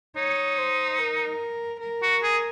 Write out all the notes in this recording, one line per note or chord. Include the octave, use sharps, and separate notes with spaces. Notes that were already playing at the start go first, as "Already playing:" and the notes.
D#4 C#5
C5
A#4
A#4
F#4
G#4